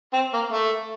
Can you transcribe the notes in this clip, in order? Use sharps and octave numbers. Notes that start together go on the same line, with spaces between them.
C4
A#3
A3